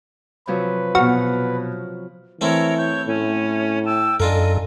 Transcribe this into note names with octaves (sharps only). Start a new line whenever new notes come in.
C3 F3 F#3 B4
B2 F#4 F6
E3 A3 C4 E4 A#4 C#5
C#5 G6
A2 C#4
G5 A5 E6
F#2 D4 F4 A4 A#4 D#5 G#5